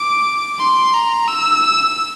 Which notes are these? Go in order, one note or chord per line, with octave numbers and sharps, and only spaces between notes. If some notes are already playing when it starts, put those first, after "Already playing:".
Already playing: D6
C6
A#5
E6